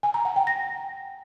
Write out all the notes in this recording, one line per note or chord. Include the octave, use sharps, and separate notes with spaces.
G#5
A#5
F#5
G5
A#6